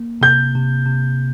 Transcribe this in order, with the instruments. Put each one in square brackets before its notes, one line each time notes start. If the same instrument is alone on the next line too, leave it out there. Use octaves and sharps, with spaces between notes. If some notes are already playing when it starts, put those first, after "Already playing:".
Already playing: [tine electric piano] A#3
[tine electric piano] C3 [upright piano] G6
[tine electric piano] C3
C3